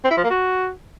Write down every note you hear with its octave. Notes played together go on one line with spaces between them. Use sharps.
C4
E4
F3
A#3
F#4